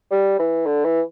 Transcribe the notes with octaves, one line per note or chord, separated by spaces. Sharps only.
G3
E3
D3
E3